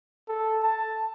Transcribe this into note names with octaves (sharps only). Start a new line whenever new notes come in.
A4
A5